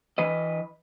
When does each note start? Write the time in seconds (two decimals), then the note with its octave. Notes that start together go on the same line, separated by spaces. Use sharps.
0.18 E3 B4 D#5